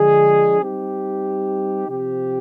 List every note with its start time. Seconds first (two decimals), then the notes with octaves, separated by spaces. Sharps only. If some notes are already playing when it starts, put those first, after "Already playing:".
Already playing: D3 F3 G#3 D4 G#4
0.61 G3 C4 D#4 G4
1.89 C3 F3 C4 G4